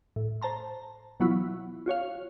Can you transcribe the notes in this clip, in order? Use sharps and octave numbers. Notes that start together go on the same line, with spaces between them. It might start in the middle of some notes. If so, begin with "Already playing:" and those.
A2
C5 A5 A#5 C6
B2 E3 F#3 B3 E4 F4
F4 F#4 C#5 F5